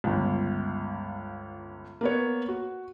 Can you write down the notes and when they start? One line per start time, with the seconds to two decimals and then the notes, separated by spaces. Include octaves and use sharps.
0.04 G1 C#2
2.01 A#3 B3 C#5
2.48 F#4